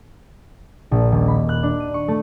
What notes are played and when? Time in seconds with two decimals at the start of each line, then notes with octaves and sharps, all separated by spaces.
0.91 A#1
1.12 D#1
1.28 B5
1.49 F#6
1.63 D4
1.80 D#7
1.94 C#6
2.08 A3